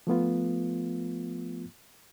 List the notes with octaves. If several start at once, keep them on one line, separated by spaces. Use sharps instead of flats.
F3 A3 B3 F4